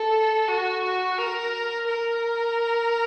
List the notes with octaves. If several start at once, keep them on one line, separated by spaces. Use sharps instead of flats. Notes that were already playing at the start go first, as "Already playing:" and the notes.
Already playing: A4
F#4
F#4
A#4
A#4